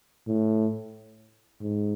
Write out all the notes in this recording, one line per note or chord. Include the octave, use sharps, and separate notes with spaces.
A2
G#2